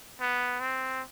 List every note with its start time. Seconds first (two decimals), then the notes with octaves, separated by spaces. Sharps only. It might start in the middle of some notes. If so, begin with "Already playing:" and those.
0.21 B3
0.60 C4